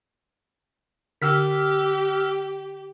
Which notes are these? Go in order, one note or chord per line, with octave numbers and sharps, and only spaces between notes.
D3 G4 E6 F6 B6